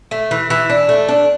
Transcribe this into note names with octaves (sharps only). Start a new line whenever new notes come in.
A3
E3
E3
D4
A3
D4